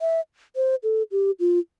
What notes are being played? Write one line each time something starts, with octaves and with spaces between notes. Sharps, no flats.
E5
C5
A4
G4
F4